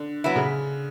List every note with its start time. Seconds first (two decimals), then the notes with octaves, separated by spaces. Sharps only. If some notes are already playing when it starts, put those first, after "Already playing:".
Already playing: D3
0.24 F#3 B3 E4
0.36 C#3